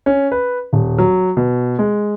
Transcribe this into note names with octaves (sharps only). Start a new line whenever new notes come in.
C#4
B4
D#1
F#3
B2
G#3